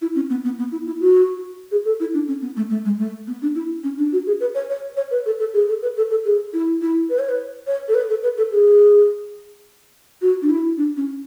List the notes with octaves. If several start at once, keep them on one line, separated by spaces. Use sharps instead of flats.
E4
C#4
B3
B3
B3
E4
E4
F#4
G#4
A4
E4
D4
C#4
B3
A3
A3
G#3
A3
B3
D4
E4
C#4
D4
F#4
G#4
B4
C#5
C#5
C#5
B4
A4
A4
G#4
A4
B4
A4
A4
G#4
E4
E4
B4
C#5
B4
C#5
A4
B4
A4
B4
A4
G#4
F#4
D4
E4
D4
C#4